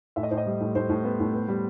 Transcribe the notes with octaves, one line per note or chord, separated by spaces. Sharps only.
A2 E5
D#5
A2 C5
D#5
G3
A2
A2 C5
A2
B3
A2
B3
G3